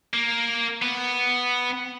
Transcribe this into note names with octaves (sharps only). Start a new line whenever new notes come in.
A#3
B3